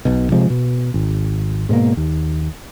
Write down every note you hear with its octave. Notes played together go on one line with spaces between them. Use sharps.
B1 B2
C3 F3 G#3
B2
G#1
G#2 B2 A3 A#3
D#2